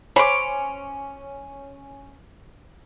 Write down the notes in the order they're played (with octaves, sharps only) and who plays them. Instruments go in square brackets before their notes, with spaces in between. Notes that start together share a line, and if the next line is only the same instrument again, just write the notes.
[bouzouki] C#4 [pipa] C5 B5 [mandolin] C#5 D6